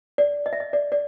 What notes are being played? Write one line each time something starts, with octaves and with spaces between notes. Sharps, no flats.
D5
D#5
E5
D#5
D5
D5